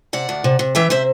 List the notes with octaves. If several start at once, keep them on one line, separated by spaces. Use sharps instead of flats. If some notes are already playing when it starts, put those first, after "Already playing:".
C3 D5 F#5
D2
C3
C3
E3 E5 G5
C3 C5 E5